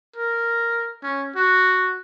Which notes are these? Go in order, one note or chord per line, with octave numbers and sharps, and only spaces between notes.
A#4
C#4
F#4